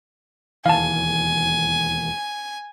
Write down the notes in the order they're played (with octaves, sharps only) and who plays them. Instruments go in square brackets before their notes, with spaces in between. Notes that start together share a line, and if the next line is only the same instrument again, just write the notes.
[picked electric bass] E1 D#2 E3 [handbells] F5 A5 [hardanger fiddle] G#5